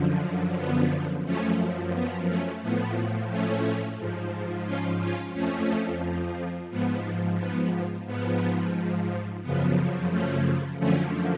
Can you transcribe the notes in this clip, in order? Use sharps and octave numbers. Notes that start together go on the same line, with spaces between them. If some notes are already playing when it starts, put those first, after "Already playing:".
Already playing: F#2 D3 F3
B3
F#2 F3 A3 C#4
B3
A3 C#4
A2 F3 B3
A3 C#4
G#2 F3
C#4 F4
C#4 F4
F2 F3 A3 C#4
G#2 F3 B3
B3
G#2 F3 B3
F#2 C#3 F3 B3
A3 C#4
F#2 D3 F3 A3 C#4